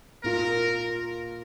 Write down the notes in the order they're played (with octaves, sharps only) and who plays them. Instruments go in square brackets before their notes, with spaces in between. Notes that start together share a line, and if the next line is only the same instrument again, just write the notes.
[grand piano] A#2 A#3 F4 [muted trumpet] A#4